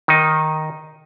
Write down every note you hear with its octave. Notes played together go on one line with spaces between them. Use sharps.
D#3 D#4